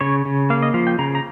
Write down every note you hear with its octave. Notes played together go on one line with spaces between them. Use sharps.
C#3 C#5
C#3
A#3 F5
D#5
F3 F5
G5
C#3 A#5
A#5